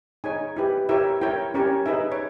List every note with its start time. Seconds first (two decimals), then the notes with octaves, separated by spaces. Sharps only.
0.24 D#4 G#4 C#5 G#5
0.57 E4 G4 B4
0.89 E4 G4 A#4 C#5 E5
1.21 E4 A#4 C#5 G5
1.54 C#4 G4 A#4 C#5
1.86 D#4 G#4 B4 E5
2.12 C#5